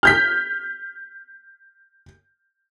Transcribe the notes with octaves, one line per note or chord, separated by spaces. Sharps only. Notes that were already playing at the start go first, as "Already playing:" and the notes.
F6 G6 B6